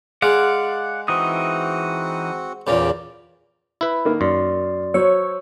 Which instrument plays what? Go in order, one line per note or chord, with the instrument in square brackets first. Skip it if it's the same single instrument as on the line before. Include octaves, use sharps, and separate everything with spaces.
[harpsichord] G#3 [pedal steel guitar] D5 F5 F#5
[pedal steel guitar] E3 D#4 D#6 [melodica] C4 F#4 F#5
[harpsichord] E2 A#2 C#3 [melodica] G4 D5 G5
[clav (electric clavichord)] E4 B4
[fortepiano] D#3 A#3
[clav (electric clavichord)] F#2 [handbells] D5 C6
[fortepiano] F#3 [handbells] C5 C#6 E6 [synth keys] C#5